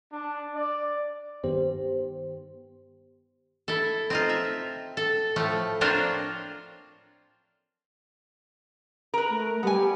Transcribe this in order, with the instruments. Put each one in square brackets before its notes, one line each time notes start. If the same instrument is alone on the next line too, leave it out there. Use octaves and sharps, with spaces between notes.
[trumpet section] D4
D5
[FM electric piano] G2 D#3 B3 G4 C5
[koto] E4 A4
C4 D#4 F4
E5
A4
A2 F3 A3
A#3 C4 D4 F4 C5 C#5
[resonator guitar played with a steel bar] A#4 B4
[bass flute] A3
[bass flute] G3 [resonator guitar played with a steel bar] B3 G#5